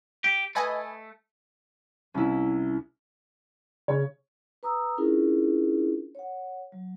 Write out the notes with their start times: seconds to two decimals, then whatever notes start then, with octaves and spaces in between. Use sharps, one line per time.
0.24 G4
0.55 A3 B4 D#5 G#5
2.14 C2 C#4 E4
3.88 C#3 C#5
4.63 B4 A#5 D#6 E6
4.98 C#4 D4 E4 F4 G#4 A#4
6.15 C#5 F#5
6.72 F#3